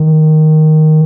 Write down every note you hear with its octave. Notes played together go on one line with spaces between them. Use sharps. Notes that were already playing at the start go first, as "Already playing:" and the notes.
Already playing: D#3